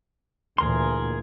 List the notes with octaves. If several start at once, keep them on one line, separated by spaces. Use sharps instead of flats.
D2 A#2 E3 G#4 A#4 C6